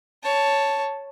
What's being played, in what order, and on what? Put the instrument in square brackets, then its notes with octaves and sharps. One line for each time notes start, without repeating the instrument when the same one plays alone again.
[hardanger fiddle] C#5 A5